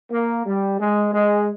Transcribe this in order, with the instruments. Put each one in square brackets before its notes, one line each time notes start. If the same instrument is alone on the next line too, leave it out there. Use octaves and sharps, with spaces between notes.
[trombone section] A#3
G3
G#3
G#3